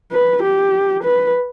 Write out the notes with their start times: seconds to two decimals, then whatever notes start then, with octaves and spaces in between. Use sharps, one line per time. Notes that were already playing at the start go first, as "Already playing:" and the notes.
0.12 B4
0.43 G4
1.04 B4